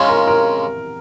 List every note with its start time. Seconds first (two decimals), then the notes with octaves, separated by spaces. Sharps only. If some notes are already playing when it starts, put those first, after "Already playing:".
Already playing: C#3 G#3 C#4 F4
0.09 A#4
0.27 A#4